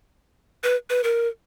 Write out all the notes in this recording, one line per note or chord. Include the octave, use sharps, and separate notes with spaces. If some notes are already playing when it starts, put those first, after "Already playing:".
B4
B4
A#4